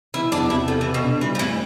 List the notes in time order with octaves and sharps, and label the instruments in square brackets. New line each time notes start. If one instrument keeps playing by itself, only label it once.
[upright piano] E3 [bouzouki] E4
[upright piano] E2 [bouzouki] D4
[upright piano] C3 [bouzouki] E4
[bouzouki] F3 [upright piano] A4
[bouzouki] E3
[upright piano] B3
[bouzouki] B2
[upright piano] D4
[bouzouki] E3 [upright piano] G3
[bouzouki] F3
[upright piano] A2 [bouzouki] E3